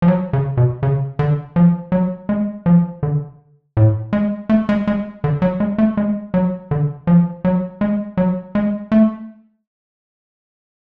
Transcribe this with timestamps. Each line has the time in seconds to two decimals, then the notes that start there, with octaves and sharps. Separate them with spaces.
0.02 F3
0.08 F#3
0.33 C#3
0.57 B2
0.83 C#3
1.19 D3
1.56 F3
1.92 F#3
2.29 G#3
2.66 F3
3.03 D3
3.77 A2
4.13 G#3
4.49 A3
4.69 G#3
4.87 G#3
5.24 D3
5.42 F#3
5.60 G#3
5.78 A3
5.97 G#3
6.34 F#3
6.71 D3
7.07 F3
7.45 F#3
7.81 G#3
8.17 F#3
8.55 G#3
8.92 A3